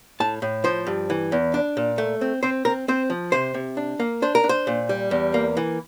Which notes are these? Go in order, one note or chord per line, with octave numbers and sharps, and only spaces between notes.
A2 A5
A2
F3 C5
G2
E3
E2
D4
A#2
A3
C4
C4 C5
C4 A#4
C4 C5
F3
C3 C5
C3
D4
A#3
D4 C5
A#4
D4
C5
A#2
G3
E2
A#3
E3